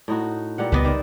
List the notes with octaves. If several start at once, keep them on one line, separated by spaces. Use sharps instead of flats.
A2 D#4 F#4
A#2 G3 F#5
C#2 A3 B3 B4 D5 D#5
D#3 C5 D5